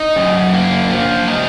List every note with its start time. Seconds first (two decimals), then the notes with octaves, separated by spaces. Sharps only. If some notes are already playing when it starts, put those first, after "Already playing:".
Already playing: D#4
0.16 F#2
0.53 A#3
0.91 F3
1.28 D#4